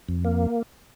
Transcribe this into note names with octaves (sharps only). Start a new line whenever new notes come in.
F2
A#3